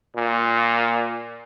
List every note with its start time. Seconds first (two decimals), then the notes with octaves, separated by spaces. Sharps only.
0.16 A#2